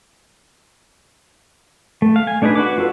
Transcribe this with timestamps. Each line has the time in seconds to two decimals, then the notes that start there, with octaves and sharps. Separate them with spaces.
2.02 A3
2.16 F5
2.27 G#5
2.42 A3 D4 D#4 G#4 B4
2.55 F#4 B4 D6
2.78 F4 F#4 A4 B4